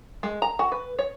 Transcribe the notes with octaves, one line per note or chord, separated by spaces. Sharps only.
G#3
A#5
F#4
B4
C#5